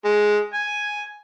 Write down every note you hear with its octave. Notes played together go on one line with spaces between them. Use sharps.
G#3
G#5